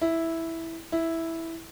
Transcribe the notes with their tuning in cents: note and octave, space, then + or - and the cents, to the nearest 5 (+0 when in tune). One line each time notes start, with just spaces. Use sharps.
E4 -5
E4 -5